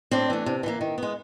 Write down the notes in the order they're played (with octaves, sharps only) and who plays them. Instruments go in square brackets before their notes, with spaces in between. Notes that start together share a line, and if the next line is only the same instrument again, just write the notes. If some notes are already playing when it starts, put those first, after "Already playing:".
[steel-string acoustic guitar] A2 C4 D4
E3 A3
C3
E3 G3 A#3
D#3
G#3 B3